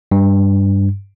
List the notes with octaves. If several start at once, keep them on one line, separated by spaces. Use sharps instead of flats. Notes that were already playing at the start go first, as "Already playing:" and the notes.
G2